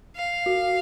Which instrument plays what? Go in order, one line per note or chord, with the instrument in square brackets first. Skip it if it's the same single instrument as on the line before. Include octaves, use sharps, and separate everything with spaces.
[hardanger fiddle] F5
[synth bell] F#4